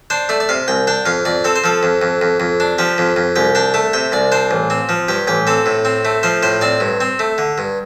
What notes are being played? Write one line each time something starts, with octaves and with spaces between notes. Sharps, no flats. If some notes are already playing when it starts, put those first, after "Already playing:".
D4 C5
A3 D5
D5
C3 F5
C2 G5
D4 G5
F2 F5
F2 D5
C4 A4
C5
F3 A4
F2
F2
F2
F2
D4
F3 G4
F2
F2
C2 G4
D4 G5
A3 A5
C3 G5
C2 D5
D4 C5
A1
C4
F3
G2 G4
A1 G4
C4 A4
A2
C4
A3
F3 C5
A2 C5
C4 D5
G2
C4
A3
D3
G2